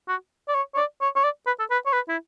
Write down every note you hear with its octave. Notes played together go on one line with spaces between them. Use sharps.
F#4
D5
C#5
C#5
D5
C#5
C#5
D5
B4
A4
B4
C#5
B4
E4